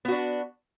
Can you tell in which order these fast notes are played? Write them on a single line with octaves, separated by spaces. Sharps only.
B3 F#4 D4